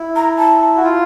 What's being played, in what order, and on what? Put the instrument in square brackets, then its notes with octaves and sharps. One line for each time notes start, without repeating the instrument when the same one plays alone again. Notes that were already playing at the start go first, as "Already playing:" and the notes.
Already playing: [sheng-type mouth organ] E4
[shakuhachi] A#5
A5
[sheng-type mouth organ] F#4
F4